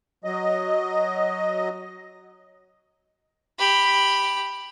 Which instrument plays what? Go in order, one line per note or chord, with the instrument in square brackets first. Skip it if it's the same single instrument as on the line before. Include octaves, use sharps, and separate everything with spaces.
[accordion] F#3 D#5
[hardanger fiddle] G4 B5